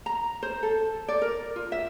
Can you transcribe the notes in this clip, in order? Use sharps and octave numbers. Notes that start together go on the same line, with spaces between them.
A#5
C5
A4
D5
A#4
F4
E5